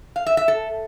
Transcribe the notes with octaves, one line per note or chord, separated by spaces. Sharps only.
F5
E5
E5
A4